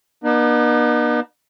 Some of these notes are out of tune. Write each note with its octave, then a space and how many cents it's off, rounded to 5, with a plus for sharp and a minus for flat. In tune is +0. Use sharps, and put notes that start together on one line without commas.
B3 -45 D#4 -40